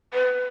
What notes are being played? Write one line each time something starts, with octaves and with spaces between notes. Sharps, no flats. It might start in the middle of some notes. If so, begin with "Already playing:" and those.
B4